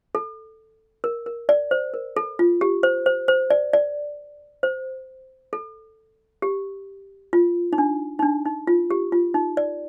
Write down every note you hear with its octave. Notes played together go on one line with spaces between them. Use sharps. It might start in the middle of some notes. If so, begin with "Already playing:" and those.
A4
A#4
A#4
D5
C5
A#4
A4
F4
G4
C5
C5
C5
D5
D5
C5
A4
G4
F4
D#4
D4
D#4
D4
D#4
F4
G4
F4
D#4
D5